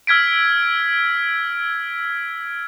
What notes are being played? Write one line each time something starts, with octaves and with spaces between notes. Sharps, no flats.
E6 F6 G#6 B6 D7